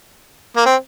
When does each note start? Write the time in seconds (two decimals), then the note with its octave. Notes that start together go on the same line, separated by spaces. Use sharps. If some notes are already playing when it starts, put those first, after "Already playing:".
0.57 A#3
0.66 C4